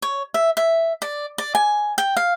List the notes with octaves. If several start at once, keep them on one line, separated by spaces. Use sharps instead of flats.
C#5
E5
E5
D5
D5
G#5
G5
F5